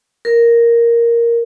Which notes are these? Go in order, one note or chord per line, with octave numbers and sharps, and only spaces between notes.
A#4